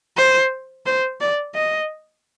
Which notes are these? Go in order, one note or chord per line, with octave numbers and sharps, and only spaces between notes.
C5
C5
D5
D#5